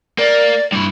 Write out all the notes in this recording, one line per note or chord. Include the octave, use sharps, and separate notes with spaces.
A#3 D5
G2 E4